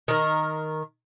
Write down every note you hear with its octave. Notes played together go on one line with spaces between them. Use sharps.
D#3 A#4